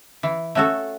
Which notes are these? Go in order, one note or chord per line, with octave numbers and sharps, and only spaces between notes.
E3
A3 C#4 F#4 A4